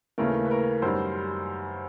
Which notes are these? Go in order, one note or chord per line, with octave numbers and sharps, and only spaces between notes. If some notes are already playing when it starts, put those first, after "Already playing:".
D#2 C#3 E3 A3 A#4
B4
A#4
F#2 D#3 G3 C5